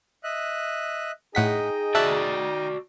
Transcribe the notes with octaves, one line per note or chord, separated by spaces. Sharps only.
D#5 E5 F#6
A2 D#4 G#4 D#5 F#5 G5 B6
F#4 D5 E5 G#5 A5 F#6